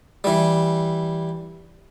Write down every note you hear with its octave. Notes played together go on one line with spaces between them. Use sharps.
E3 G3